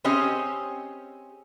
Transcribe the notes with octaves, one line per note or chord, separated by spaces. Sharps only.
C4 C#4 G4 G#4 D#5